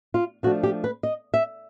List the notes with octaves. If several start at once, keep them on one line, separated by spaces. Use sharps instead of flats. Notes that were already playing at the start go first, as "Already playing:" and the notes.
F4
F3 A3 D4 F#4
G4
B4
D#5
E5